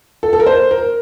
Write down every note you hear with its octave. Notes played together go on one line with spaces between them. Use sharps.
A4
A4
A#4
C5
A#4